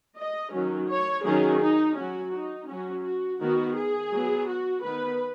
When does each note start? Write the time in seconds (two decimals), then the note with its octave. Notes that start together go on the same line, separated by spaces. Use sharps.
0.17 D#5
0.52 D#3 F#3 C#4
0.88 C#5
1.24 D#3 F#3 C#4 G#4
1.61 D#4
1.96 F#3 C#4 F#4
2.33 D#4
2.68 F#3 C#4 F#4
3.03 F#4
3.40 D#3 B3 F#4
3.75 G#4
4.11 F#3 B3
4.48 F#4
4.83 D#3 B3 B4